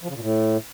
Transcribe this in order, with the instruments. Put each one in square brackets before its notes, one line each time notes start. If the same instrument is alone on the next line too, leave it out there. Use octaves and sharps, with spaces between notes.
[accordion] F3
C#3
A#2
A2